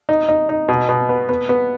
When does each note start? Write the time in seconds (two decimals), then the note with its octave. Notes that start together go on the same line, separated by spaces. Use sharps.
0.09 D#4
0.29 D#4
0.49 D#4
0.68 B2
0.89 B2
1.09 B3
1.29 B3
1.49 B3